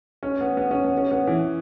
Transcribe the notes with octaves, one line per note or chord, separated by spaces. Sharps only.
C#4
B3
B3
C#4
B3
C#4
B3
E3